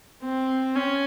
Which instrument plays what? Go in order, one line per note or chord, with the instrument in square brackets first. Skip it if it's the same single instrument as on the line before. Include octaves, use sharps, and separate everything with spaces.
[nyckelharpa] C4
C#4